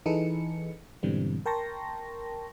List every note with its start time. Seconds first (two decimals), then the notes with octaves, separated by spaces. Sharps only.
0.06 E3 D#4 G#4 A4 B4 C#7
1.03 G#2 B2 D3 E3 G3 C4
1.46 A#4 G5 A5 C6 C#6 A#6